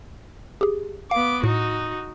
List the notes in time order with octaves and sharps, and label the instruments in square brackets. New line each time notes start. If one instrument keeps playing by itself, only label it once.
[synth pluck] G4 G#4
[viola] B3 D6 [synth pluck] F5
[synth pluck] A2 [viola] D#4 F#4